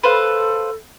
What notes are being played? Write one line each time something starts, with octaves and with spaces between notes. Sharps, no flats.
A4 B4 C5 F5